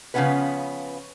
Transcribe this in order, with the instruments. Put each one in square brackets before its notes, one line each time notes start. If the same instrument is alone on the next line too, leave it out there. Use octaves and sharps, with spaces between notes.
[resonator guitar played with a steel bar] C#3 F3 G#3 B3 C#4 B4